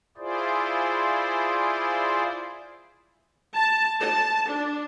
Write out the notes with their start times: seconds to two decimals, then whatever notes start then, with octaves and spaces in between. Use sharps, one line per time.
0.17 E4 F4 G#4 C5 D5
3.55 A5
4.00 A5
4.48 D4